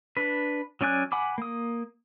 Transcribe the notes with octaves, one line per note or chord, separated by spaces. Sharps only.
D4 B4
F#3 C#4 D5 G#5 F#6
F#5 G#5 B5 D6
A#3 D#6